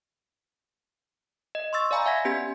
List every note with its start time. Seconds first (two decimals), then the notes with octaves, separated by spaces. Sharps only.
1.55 D#5
1.73 C6 C#6 E6 A6
1.91 D5 F5 G#5 A#5 B5
2.06 E5 F#5 G#5 G#6 A#6 B6
2.25 B3 C#4 G4 B4 G#6 B6